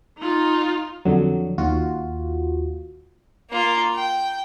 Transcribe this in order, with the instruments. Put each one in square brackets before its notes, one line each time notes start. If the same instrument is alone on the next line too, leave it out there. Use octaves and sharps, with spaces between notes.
[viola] D#4 F4
[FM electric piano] F2 D3 F#3
D#2 F4 F#4
[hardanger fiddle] A#3 F4
G5